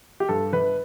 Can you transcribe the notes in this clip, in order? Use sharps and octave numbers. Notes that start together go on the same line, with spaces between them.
G4
G2 A4
G1 B4